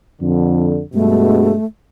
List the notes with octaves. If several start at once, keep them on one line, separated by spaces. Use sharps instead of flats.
F2 D3
G2 B2 G#3 A3